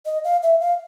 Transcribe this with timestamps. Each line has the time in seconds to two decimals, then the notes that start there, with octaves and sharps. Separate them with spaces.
0.06 D#5
0.24 F5
0.43 E5
0.60 F5